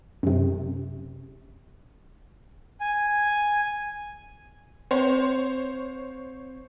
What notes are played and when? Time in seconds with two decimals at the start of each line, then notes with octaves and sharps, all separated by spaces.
0.23 F#2 C3
2.80 G#5
4.91 C4 C5 C#5